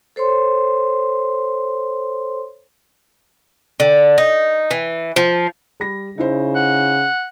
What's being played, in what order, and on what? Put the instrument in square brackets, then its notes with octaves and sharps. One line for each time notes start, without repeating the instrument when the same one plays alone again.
[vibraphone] A4 C5 C#5 C6
[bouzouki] D3
D#4
E3
F3
[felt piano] G3 B5 A#6
[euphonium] C#3 [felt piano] D#4 E4 C5
[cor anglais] F#5